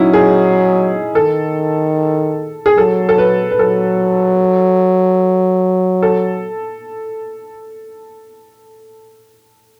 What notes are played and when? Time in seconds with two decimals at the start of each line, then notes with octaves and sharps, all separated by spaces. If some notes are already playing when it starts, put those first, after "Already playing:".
Already playing: F#3 C#4 D#4 E4
0.13 G#4
1.15 D#3 A4
2.66 G#4
2.77 F#3 A4
3.09 A4
3.18 B4
3.51 B4
3.59 F#3 A4
6.03 A4